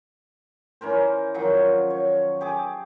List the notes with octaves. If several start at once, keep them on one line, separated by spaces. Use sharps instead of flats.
E3 C#4 A#4 C5
D#3 F3 F#3
C#5
G4 G#4 D6